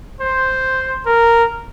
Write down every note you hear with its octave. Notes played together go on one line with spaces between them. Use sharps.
C5
A#4